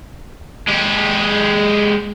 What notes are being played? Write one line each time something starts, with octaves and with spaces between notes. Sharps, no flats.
G#3 G4